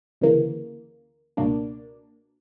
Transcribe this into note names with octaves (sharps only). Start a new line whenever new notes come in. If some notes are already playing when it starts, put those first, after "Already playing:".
D2 C#3 E3 A#3
C#2 B2 A#3 D4